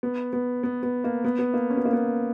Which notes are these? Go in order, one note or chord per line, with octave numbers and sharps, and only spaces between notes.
B3
B3
B3
B3
A#3
B3
B3
A#3
C#4
B3
A#3
B3